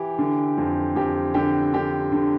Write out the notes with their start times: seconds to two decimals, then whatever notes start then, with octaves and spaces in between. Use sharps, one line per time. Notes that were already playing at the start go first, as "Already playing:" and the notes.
Already playing: E3 G4
0.18 D3
0.58 F2
0.96 F2 G4
1.34 D3 G4
1.73 D3 G4
2.12 D3